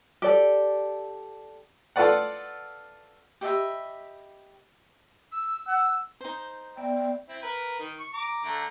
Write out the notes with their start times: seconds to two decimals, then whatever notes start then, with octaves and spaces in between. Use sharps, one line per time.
0.22 G4 A4 D5
1.96 F4 A4 B4 D5 F#5
3.41 G4 D#5 E5 B5
5.32 E6
5.68 F#5 E6
6.21 D#4 C5
6.77 B3 D5 E5 G5
7.29 C4 E4
7.42 A#4 B4
7.80 D#3
7.99 C#6
8.14 A#5 D6
8.45 D3 A3 A#5